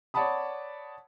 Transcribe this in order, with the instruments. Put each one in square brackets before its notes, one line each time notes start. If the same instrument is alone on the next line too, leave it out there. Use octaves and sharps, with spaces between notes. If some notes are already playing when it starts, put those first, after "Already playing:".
[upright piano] C#5 D5 F#5 A5 B5 D#6